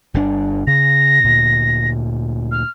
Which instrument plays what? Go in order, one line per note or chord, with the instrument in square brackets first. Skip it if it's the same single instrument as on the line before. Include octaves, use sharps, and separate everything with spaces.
[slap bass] G1 D3 D4
[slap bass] C#3 [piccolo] A#6
[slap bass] D2 A#2
[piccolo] F6